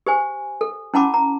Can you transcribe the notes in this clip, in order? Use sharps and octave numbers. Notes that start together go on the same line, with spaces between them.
G4 C5 G#5
A4
C#4 E4 F#5 A5 B5 D6
A#5